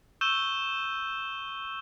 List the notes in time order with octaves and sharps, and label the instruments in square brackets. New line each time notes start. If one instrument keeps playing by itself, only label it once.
[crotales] C#6 E6 G6 D#7 E7 G7